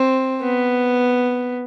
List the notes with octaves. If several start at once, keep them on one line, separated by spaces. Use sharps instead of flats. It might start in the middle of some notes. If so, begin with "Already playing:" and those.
Already playing: C4
B3